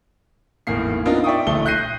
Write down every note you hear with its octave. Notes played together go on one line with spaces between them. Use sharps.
G#1 E2 A2 A#3 C7
B3 C4 D4 D#4 F4 A#4
D5 E5 G5 C#6 D#6
D1 A#1 A3 G7
F#6 G6 A#6 C7 D#7